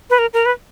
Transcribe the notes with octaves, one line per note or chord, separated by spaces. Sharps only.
B4
A#4
A#4
B4